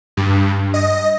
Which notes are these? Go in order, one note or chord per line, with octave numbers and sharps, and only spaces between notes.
G2
D#5